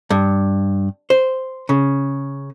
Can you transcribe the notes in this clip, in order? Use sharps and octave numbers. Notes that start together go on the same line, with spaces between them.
G2
C5
C#3